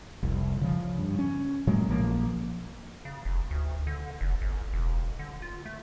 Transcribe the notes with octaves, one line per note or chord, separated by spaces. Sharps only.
F1 C2
C#3 F3
G2
C#4
A2 F#3 G#3 A#3
A#1 F3 A#3
C#3
F1
D2
D3
F1
G1
E1
D3
F4
A3